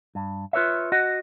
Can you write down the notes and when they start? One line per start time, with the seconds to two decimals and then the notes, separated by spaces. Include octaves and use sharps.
0.15 G2
0.53 F4 B4 C#5 E5
0.92 F#4 D#5 F#5